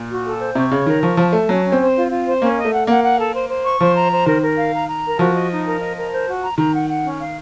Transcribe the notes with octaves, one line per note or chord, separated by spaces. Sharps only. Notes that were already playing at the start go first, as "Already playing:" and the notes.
Already playing: A#2
F#4
A4
C5
C3 C#6
C#3 C#5
D#3 A#4
F3 C#6
F3 A5
A3 A5
F#3 C#4
C#4
C4
C5
F4
F4
C5
A#3 C#4
D#5
A3
F#5
A#3 F#5
F#5
A4
C5
C5
C#6
F3 C5
A#5
C5
D#3 A#4
A#4
F5
A#5
A#5
A#4
F3 F#4
D#5
D#4
A#4
D#5
A#4
C5
F#4
A#5
D#3 A#5
F#5
F#5
C#4
F5